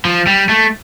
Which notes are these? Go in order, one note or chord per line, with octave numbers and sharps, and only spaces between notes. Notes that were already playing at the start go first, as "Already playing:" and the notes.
F3
G3
A3